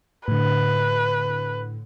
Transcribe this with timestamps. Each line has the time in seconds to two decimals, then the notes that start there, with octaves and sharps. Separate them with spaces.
0.28 A2 D3 B4